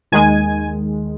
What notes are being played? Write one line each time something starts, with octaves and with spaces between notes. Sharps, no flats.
D#2 D#3 G#3 G#5